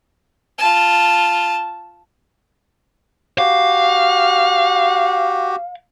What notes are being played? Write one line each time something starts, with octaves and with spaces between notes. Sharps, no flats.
F4 A5
F#4 G4 F5